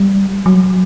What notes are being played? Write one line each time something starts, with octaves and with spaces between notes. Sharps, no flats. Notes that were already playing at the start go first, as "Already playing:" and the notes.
Already playing: G3
F#3